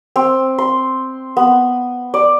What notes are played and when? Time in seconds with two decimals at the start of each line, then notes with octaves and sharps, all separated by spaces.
0.16 C4
0.58 C6
1.37 B3
2.14 D5